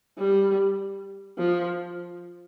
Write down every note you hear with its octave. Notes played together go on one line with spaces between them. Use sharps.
G3
F3